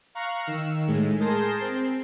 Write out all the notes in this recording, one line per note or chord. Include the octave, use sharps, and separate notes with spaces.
F5 A#5 C#6 F#6
D#3 E6
A2 G#3
G#4 A#4 A5 C6 G6 A#6
C4